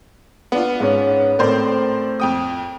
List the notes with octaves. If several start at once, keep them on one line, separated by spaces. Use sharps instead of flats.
B3 D4 F4
G#2 C#4
A2 C4 A#4 C5 D5
F2 G5 D#6